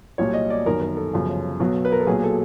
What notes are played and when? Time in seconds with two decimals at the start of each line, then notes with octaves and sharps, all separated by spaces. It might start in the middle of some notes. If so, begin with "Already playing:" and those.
0.18 C2 A#2 F#3 C#5
0.34 D#5
0.50 D5
0.66 G1 F#2 D#3 A#4
0.82 A#4
0.97 A4
1.13 G1 F#2 C#3 F3
1.60 B1 B2 F#3
1.85 B4
1.92 A#4
2.00 A4
2.07 B1 A#2 F#3 G#4
2.24 A4